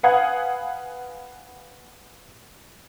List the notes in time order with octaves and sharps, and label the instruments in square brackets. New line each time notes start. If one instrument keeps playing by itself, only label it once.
[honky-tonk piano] B4 F5 F#5 G#5 D#6 G#6